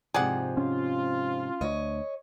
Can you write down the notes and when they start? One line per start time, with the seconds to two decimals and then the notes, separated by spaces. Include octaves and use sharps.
0.14 G#2 C3 F3 G#4 D5 F#5
0.57 C#4 F4
1.61 D2 C#5 D#5